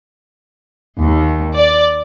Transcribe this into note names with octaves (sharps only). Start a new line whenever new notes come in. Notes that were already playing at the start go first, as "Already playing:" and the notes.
D#2
D5